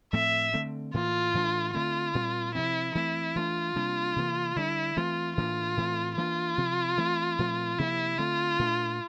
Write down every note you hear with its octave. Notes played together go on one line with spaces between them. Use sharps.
A2 F3 A3 C4 E5
D3 A3 C4
A2 E3 A#3 F4
A2 E3 A3 D4
D3 A3 C4 F4
A#2 G3 C4
C3 F3 C4 E4
E3 A3 C4 E4
E3 A3 D4 F4
C3 G3 A#3 D4
C3 E3 A#3
D3 G3 D4 E4
E3 A3 C4 F4
A2 E3 A#3 D4 F4
A2 E3 A3 C4
E3 A#3 D4 F4
C3 F3 C4
E3 A3 C4
A#2 F3 A3 C4
C3 F3 A#3 E4
D3 A3 C4 F4
A#2 A3 D4